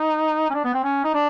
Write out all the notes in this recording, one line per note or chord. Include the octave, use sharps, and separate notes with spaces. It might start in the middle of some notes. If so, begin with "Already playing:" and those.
Already playing: D#4
C#4
D4
B3
C4
C#4
D#4
D4